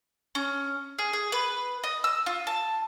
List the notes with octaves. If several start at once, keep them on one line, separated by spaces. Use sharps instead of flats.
C#4
G#4
G#4
B4
D#5
E6
F4
A5